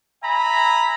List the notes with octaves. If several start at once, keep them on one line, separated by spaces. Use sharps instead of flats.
E5 G#5 A#5 B5